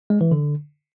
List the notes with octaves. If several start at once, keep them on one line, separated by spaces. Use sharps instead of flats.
G#3
E3
D3